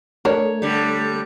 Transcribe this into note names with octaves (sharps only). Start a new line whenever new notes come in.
A3 D4 A#4 C#5
D3 G3